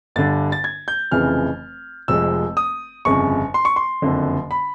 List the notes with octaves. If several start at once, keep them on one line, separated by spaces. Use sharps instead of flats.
G1 G2 D3 A6
A6
G#6
G6
F1 F2 C#3 E3 F6
F1 F2 C3 F3 G#3 E6
D#6
G1 F2 C#3 C#6
C6
C#6
C6
F#1 F2 D3
B5